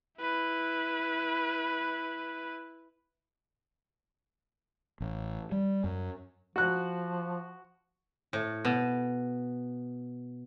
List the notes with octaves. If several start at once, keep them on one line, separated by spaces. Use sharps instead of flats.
E4 B4
A1
G3
F#2
F3 F#4 F#6
A2
B2